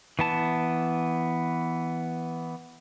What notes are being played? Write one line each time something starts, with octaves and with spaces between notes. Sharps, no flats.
E3 B3 A5